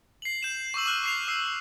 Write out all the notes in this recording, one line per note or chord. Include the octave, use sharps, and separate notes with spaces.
C7 F#7
G6 E7
C#6 D6 E6 F#7
D6 F6 F#6
D6 C7 F7
D#6 E6 C7